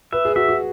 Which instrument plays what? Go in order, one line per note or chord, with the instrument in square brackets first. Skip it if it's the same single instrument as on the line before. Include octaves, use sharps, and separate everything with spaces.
[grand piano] B4 [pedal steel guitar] E5
[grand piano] G#4
[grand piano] F#4 [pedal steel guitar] E5
[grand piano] F#4